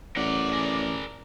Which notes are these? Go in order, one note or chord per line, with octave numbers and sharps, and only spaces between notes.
A1 A#4 D5 F#5
G#4 A#4